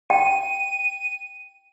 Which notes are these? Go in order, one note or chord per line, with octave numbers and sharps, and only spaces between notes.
G5 D#7